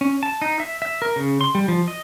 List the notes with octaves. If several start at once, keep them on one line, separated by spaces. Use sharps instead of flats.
C#4
A5
D#4
E5
E5
A#4
C#3
C6
G3
F3
D#5